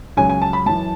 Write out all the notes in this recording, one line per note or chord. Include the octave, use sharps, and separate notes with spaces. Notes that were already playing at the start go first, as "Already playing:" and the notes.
C#2 C#3 F#3 G#5
G#5
A5
B5
F#2 E3 A5